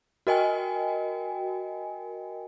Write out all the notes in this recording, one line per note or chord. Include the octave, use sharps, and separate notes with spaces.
F#4 A#4 D#5 G5 G#5